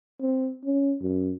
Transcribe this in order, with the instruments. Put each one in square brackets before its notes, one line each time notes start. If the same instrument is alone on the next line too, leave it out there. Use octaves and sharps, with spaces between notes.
[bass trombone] C4
C#4
F#2